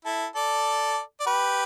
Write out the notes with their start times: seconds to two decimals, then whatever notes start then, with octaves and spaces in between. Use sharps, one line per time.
0.05 E4 A4
0.35 A4 D5
1.20 D5
1.26 G4 B4